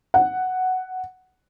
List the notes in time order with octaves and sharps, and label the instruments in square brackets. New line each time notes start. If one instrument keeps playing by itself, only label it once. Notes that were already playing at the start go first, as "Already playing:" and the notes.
[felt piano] F#5